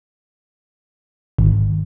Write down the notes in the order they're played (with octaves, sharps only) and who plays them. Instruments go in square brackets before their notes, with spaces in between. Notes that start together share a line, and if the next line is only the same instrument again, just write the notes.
[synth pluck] G#1